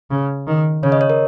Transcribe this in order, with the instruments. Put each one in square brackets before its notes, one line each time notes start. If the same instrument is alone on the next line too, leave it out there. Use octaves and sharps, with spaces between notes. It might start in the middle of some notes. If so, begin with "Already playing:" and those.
[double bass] C#3
D#3
[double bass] C#3 [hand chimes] C#5
[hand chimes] D#5
C#5
A#4